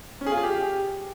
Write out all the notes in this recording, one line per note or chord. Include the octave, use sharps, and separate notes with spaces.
C#4
G#4
F4
G#4
G4